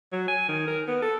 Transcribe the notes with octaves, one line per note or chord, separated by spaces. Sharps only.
F#3
G#5
D#3
A#4
B3
A4